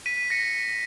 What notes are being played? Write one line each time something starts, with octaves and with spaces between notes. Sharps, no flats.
B6 D#7
A#6 C#7